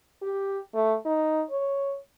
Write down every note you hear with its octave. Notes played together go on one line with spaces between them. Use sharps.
G4
A3
D#4
C#5